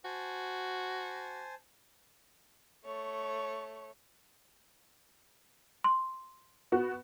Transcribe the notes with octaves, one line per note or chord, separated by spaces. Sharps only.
F#4 C5 G#5 A5
A3 C#5
C6
B3 F#4